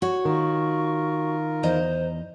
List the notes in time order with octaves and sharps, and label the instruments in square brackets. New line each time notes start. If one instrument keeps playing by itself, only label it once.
[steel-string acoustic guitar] F#4 C#5 [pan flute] C#6
[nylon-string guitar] D#3 [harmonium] F4 A#4
[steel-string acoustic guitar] E2 D#5 A#5 [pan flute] C5